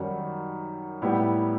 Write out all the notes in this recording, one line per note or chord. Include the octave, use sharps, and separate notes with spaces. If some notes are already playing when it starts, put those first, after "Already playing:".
Already playing: F#2 D#3 G3 D#4 F#4
A2 G3 B3 E4 G4